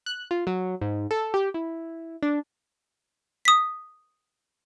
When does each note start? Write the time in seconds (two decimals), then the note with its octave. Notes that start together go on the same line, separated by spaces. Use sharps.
0.06 F#6
0.31 F4
0.47 F#3
0.81 G#2
1.11 A4
1.34 G4
1.54 E4
2.23 D4
3.45 D#6 B6